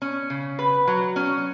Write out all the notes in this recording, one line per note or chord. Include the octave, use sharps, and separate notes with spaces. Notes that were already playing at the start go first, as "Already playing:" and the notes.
C#4
C#3
B4
F#3
C#4